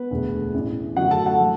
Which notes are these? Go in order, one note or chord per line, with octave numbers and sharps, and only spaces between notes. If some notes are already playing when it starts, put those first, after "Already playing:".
Already playing: B3 B4
E1 D2 D3 A3
A1 A2 E3
F#2 D3 A3 F#4 F#5
A4 A5
F#4 F#5
F#3 A3